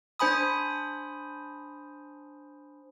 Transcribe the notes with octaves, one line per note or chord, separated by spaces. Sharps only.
D4 C5 G#5 B5 D#6